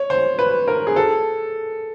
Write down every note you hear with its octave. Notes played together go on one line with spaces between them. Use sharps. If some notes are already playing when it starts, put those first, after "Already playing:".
Already playing: C#5
C5
B4
A#4
G#4
A4